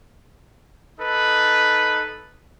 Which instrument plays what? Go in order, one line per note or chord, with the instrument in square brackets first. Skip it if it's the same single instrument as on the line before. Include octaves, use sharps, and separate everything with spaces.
[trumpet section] D#4 A4 B4